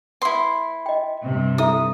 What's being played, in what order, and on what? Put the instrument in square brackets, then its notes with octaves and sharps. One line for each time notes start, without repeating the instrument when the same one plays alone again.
[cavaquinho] E4 C6 [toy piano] B4 D#6
[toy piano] D#5 G5
[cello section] G2 C3
[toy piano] E4 A4 E5 [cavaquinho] D#6